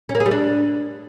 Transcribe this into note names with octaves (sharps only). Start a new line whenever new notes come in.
C#4
A#3
G#4
G3
D4